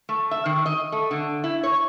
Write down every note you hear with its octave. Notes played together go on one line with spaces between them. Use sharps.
A3
E5
D#3
D#5
A3
D3
E4
C#5